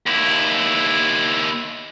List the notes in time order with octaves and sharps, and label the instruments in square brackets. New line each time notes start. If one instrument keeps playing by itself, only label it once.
[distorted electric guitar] D#2 E4